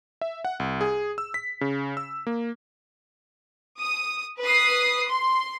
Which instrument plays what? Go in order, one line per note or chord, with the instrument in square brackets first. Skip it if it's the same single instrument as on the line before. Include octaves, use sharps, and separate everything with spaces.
[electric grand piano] E5
F#5
C2
G#4
E6
B6
C#3
E6
A#3
[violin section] D#6
B4 D#6 C7
C6